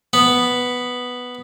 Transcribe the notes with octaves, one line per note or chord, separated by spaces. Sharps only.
B3